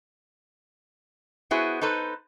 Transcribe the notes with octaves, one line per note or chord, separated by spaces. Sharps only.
B3 E4 F#4 G#4 C5
D#4 A4 B4 C5